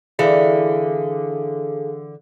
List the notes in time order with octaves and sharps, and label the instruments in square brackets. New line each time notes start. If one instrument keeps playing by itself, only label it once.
[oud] D3 E3 E5 [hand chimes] G#4 A4 F5